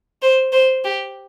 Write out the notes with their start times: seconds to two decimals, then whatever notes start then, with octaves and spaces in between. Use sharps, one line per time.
0.22 C5
0.52 C5
0.84 G4